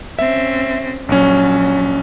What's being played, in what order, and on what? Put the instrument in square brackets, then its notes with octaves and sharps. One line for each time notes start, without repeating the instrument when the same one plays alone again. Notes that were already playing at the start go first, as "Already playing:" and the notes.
[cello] C4 C#4 [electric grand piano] E5
[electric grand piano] A#1 C#4 [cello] F#3